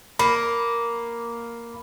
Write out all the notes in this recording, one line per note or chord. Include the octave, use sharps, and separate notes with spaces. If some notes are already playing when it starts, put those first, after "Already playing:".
A#3 B5